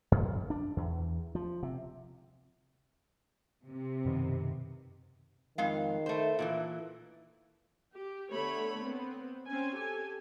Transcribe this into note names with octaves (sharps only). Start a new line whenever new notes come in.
F#2
D4
E2
F3
C3
C3
F#2 B2 D#3
F2 D#3 G#3 F5
A3 C5
A#2 D#3 E3
G4
D3 A3 B3 C#5 B5
B3 C4
C4 C#4 G#5
G4 A4 G#5